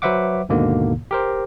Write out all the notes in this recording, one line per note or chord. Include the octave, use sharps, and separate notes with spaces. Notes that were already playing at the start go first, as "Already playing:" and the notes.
F#3 B4 C5 E5 F#5 D6
D#2 G#2 B2 D3 A#3
G4 A#4 C5